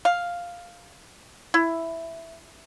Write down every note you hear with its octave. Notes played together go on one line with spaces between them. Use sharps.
F5
E4